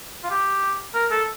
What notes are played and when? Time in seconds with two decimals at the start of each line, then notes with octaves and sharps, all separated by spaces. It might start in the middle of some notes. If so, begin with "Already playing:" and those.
0.23 F4
0.31 G4
0.95 A#4
1.11 A4